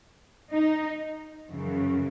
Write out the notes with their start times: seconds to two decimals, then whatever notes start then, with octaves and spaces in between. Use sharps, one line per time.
0.52 D#4
1.50 F#2 C#3 E3